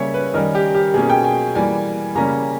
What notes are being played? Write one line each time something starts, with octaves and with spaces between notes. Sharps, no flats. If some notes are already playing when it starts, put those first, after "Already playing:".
Already playing: C#3 G3 A#3 C#4 C#5 E5
B4
D#3 G3 C#4 A#4
G4
G4
B2 A#3 C#4 G#4
G5
G#5
E3 G3 A#3 G#5
C#3 G3 A#3 C#4 A#5